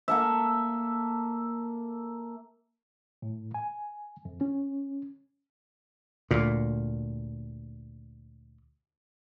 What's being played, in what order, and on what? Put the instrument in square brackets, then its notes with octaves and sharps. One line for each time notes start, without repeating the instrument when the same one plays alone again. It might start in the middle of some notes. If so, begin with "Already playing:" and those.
[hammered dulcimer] A#3 A4 E5
[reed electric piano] A2
G#5
F2
C#4
[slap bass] D2 A#2